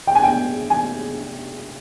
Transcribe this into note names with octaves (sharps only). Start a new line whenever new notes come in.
G5
G#5
G5
G#5